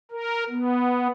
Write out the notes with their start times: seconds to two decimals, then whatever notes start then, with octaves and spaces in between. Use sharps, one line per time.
0.11 A#4
0.50 B3